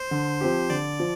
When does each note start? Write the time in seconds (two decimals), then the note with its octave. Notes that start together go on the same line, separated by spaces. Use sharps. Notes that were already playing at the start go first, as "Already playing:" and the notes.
Already playing: C5
0.11 D3
0.41 F3 C4 G4
0.70 D3 D5
1.00 F3